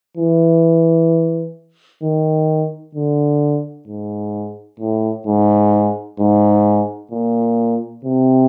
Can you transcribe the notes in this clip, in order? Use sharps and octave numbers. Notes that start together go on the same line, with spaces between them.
E3
D#3
D3
G#2
A2
G#2
G#2
A#2
C3